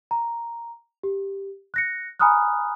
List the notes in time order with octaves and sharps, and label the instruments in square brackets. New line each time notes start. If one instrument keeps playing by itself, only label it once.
[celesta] A#5
G4
F#6 A#6 C#7
G#5 A#5 B5 D#6 F6 F#6